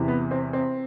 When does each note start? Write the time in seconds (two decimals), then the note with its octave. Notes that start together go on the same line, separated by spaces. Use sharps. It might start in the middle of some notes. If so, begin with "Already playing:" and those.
Already playing: E2 C3 E3
0.08 B3
0.31 C4
0.53 C4